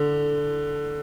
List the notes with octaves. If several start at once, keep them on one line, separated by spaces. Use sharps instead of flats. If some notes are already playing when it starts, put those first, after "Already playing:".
Already playing: D3